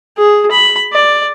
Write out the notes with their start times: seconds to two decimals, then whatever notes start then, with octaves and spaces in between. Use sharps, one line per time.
0.17 G#4
0.51 B5
0.92 D5